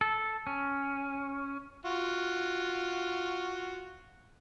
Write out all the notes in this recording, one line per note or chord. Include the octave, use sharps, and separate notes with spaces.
A4
C#4
F4 F#4